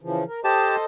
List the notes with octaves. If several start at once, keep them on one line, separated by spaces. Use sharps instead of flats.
C#3 E3 F3
A#4
G4 A4 C5 D#5 A5